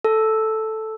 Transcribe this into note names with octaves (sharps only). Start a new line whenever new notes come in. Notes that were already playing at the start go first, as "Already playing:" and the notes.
A4